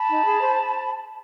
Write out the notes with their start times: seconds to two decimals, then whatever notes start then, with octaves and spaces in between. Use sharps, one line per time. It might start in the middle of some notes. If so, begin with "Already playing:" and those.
Already playing: A5 B5
0.09 D#4
0.25 G#4
0.39 C5